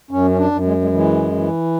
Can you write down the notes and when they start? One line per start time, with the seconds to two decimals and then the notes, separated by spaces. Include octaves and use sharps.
0.11 F#2 C#4
0.31 C#4
0.38 D4
0.51 F#2
0.65 G#3
0.82 G#3
0.92 E3 G#3
1.32 E3